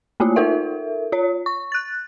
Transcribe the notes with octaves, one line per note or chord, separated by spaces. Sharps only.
A3 A#3 E4 F4
D#4 F4 A4 A#4 E5
F4 C#5
C#6
F#6 A6